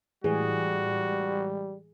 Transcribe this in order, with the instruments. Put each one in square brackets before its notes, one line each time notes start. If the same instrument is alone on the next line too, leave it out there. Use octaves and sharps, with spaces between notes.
[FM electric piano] A2 E3 G#3 [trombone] G3 [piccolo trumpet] F#4 [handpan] G#4